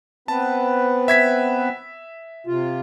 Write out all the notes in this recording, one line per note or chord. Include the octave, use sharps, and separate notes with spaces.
B3 C4 B4 A5
E5 G#6 B6
C3 F4